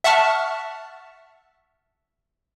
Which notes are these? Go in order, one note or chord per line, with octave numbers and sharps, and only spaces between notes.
E5 F#5 A5 C#6 F6